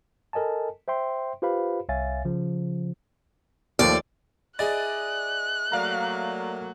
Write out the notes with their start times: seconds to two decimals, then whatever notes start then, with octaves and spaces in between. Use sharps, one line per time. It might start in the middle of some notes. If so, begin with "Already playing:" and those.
0.33 A4 A#4 D#5 G#5 A5
0.88 C5 E5 G5 C6
1.42 F4 G4 B4 C5 F5 B5
1.89 C2 C#5 E5 F5 G#5 A6
2.25 C#3 F3
3.79 D#2 F3 A3 D5
4.59 E4 G#4 D5 D#5 F#6 A6
5.72 F#3 A3 A#3 D5 F5 A#5